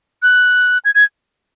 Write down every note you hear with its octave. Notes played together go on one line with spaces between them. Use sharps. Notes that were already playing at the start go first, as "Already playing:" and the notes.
F#6
G#6
G#6